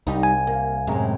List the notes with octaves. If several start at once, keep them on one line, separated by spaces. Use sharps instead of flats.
C2 G3 D#4
G#5
A#3
F#2 A2 C3 G#3